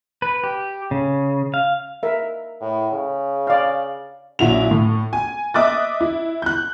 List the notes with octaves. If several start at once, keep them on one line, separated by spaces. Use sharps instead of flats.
B4
G4
C#3
F5
A#4 E5
A2
C#3
D5 F5
A#1 F#3 E4 F#4 F7
A2
G#5
D#5 E5 D6 D#6 F#6 A6
E4
F#6 G6